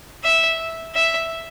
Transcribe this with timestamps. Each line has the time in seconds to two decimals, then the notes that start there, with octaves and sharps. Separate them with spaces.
0.24 E5
0.94 E5